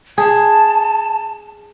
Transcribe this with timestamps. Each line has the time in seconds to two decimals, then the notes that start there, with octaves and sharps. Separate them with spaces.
0.18 G#4 A5